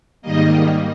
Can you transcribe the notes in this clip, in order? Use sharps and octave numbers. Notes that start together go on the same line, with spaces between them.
G#2 D#3 G3 A#3 D#5